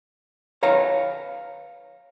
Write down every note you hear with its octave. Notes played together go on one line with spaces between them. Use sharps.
B4 C#5 F5 A#5